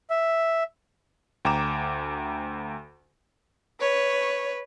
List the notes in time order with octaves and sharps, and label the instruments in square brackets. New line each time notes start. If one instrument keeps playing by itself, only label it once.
[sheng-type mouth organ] E5
[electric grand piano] D2 G5 A#5 D6 E7
[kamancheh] B4 [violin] C#5